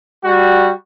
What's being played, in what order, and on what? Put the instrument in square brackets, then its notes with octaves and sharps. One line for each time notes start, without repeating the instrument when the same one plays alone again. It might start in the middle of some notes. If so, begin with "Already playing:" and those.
[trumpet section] G3 F#4